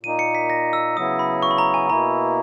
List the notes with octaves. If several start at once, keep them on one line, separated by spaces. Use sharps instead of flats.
A#2 A#3 D#4 D#7
C#7
B6
A#6
E6
C#3 F#3 B3 E4 D#6
B5
C#6
B5
A#5
G#5
B2 A#3 E4 A#5